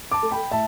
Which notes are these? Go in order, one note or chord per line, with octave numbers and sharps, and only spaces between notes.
A5 D6
A3
G5 B5
A2 E5 A5